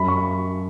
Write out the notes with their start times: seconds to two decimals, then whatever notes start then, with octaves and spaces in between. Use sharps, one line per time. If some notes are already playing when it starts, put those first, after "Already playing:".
Already playing: F#2 B5
0.08 C#6